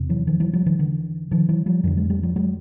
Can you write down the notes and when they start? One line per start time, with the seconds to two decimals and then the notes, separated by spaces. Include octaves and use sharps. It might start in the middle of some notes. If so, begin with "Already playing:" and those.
Already playing: E2 C3
0.09 E3 F#3
0.27 D#3 F3
0.40 E3 F#3
0.53 F3 G3
0.66 D#3 F3
0.79 D3 E3
1.31 D#3 F3
1.49 E3 F#3
1.66 F3 G3
1.83 F2 D3 F3 G3
1.97 F#3 G#3
2.10 G3 A3
2.23 F3 G3
2.36 F#3 G#3